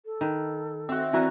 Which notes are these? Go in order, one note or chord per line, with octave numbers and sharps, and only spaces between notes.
A4
D#3 B4
C4 F#4 E5
E3 F#4 A#4 B4 D5 A#5